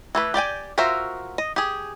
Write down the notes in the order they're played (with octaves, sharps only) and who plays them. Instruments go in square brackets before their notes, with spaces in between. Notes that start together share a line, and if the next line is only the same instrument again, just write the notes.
[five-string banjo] E3 A3 B4
G4 D5 G5 G#5
F4 F#4 A#4 C5 E5
D#5
G4 G#4